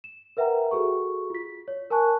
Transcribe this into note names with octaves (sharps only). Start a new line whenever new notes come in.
E7
A#4 B4 E5 F#5 G5 A#5
F#4 G#4 A4 C#6
F4 B6
C#5
A#4 G#5 A5 C#6 F#6